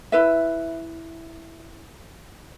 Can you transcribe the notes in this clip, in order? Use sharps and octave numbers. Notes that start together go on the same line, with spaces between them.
E4 B4 E5